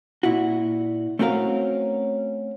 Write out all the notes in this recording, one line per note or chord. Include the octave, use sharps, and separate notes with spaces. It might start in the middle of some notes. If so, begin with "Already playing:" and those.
A#2 E4 F#4
A3 C4 C#4 F#4 A#4 F5